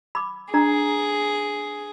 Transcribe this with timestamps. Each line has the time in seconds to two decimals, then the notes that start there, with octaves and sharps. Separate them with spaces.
0.15 B5 D6
0.54 D4 G#4 A#5